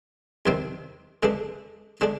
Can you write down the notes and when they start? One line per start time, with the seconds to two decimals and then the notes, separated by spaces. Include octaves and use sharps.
0.46 C2 C3 D#3 G3 C4
1.23 G2 D3 G#3 D4
2.01 D3 G#3 D4